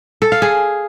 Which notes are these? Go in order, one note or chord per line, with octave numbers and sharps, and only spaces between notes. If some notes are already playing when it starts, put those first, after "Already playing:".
A4
F5
G#4